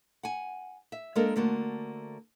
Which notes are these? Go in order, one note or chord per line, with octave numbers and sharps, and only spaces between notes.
F#5 G#5
E5
G#3 A#3 D4 A4 A#4
D3 A3 A#3 F#4 C5